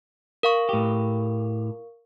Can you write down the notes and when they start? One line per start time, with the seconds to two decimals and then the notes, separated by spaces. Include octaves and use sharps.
0.43 A#4 F5 C#6
0.69 A2 G4